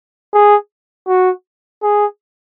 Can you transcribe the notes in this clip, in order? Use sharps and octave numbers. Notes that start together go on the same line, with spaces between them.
G#4
F#4
G#4